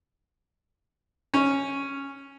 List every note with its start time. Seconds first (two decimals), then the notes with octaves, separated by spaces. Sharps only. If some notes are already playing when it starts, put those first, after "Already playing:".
1.34 C#4